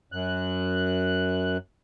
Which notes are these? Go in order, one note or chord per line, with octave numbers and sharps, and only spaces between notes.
F#2 F#6